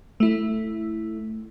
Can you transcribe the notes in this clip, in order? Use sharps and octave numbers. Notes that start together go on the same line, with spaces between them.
A3 E4